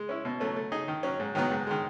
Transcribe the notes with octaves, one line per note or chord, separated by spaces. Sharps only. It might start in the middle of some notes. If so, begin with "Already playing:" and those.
Already playing: G#3
C#4 E4
B2
F#3 A3 C#4
A3
D#4 G#4 D#5
D#3
F#3 C#4
G#2
D#3 F#3 B3
G#2
D#3 G#3